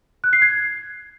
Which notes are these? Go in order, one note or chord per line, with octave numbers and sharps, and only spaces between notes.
F#6
C7
G#6